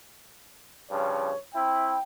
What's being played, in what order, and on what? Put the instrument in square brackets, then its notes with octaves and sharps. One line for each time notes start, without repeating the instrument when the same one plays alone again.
[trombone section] G2 C#3 F3 [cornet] C#5
[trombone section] C4 E4 [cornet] G5